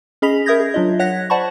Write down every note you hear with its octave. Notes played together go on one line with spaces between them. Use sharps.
C#4 G#4 D#5 B5 B6 F7
A#4 E5 D#6 G6 G#6 A#6
G#4
F#3 D4 F4 D#5
C#5 F#5 F#6 G#6 A#6 B6
C5 D5 F#5 A5 B5 C#6